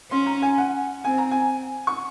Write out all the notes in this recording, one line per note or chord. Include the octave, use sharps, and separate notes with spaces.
C#4 C6
A#5
G#5
F#5
C4 G#5
A#5
G#5
C#6